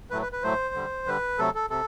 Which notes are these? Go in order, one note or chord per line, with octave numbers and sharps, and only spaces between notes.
A2 F#3 A3 B4
B4
B4
A2 F#3 A3 C5
D3 G3
D3 G3 B4
C3 F#3 A3 A4
A4
C3 A4